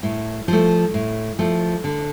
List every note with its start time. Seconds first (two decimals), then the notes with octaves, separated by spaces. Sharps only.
0.03 A2
0.48 F3 A3
0.94 A2
1.39 F3 A3
1.84 D3